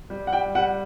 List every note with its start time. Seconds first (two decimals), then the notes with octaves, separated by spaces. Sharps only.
0.10 G3
0.27 F#5
0.32 G3 G5
0.55 G3 F#5